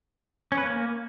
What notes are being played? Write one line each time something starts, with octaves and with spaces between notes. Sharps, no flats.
C#4
B4
A#3